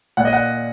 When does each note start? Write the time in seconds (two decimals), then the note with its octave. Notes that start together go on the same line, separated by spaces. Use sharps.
0.17 A#2 F#5
0.25 D#5
0.33 F#5